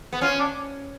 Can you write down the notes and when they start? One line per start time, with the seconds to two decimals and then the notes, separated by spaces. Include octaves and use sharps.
0.13 B3
0.21 C#4 F4
0.40 D4